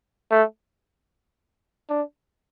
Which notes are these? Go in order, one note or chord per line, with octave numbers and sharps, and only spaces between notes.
A3
D4